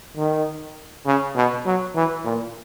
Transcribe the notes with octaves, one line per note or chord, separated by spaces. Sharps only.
D#3
C#3
B2
F#3
E3
A#2